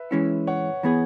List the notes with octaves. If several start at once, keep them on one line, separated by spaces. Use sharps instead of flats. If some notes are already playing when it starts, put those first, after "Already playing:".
Already playing: B4 E5
E3 G#3 C#4 E4
C#5 F#5
E3 B3 G#4